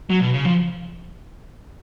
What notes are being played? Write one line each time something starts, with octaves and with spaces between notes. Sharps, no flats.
F#3
B2
C#3
F3